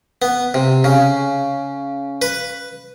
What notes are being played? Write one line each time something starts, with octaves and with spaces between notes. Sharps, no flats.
B3
C3
C#3
B4